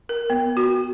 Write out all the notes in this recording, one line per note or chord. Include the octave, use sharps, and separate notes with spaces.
A#4
B3
F#4